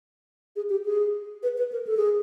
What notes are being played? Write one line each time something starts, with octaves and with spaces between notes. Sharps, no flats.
G#4
G4
G#4
B4
B4
A#4
A4
G#4